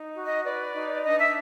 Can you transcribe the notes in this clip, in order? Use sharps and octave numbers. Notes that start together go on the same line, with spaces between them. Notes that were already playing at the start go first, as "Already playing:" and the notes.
Already playing: D#4
F#4
D#5
B4 D5
D#4
D4 D#5
E5